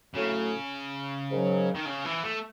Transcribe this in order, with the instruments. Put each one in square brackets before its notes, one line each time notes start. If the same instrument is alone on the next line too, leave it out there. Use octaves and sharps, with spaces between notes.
[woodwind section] A2 F#3 A3 [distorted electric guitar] C#3
[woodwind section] G#2 D#3 F#3
[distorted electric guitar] D#3
C#3
E3
A3